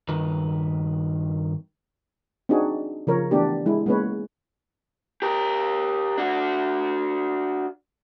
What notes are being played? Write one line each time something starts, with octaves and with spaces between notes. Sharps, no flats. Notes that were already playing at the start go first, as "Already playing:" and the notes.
G2 D#3 D#4 B4
C4 D4 D#4 F#4 G#4
C#3 F3 A#4 C#5
E3 A3 B3 D4 G4
G#3 E4
G#3 A#3 B3 C#4 B4 C#5
G4 A#4
D4 F#4